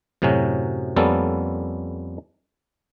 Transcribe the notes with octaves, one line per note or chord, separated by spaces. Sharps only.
F#2 A2 C3 F#3 C#4
F2 G3 A#3 B3 C#4 A4